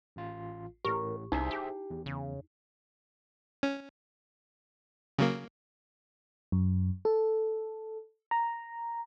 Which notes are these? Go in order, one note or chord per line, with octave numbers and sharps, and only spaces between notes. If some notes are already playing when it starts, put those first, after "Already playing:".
A1 F4
A1 A2 G4 A#4
C2 D#4 E4 G#4 C5 E5
G4
E2
C#3
C#4
C#3 F#3 A#3
F#2
A4
A#5